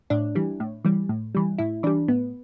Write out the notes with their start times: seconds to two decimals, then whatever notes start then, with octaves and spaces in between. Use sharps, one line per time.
0.10 A2 D4
0.35 E3 G3
0.60 A2
0.85 E3 G3
1.09 A2
1.35 E3 G3
1.58 A2 E4
1.83 E3 G3 D4
2.08 A2 B3